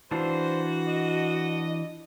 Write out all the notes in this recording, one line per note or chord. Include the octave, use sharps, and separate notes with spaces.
E3 D4 F4 F#4 C5
D#5